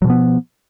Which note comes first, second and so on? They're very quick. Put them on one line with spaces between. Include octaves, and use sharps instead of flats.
F#3 B2 F3 B3